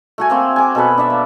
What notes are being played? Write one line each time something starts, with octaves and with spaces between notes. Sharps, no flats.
A3 F#4 G#5
A#3 C4
G#5 D6
B2 A4 B4
D4 E5
A#3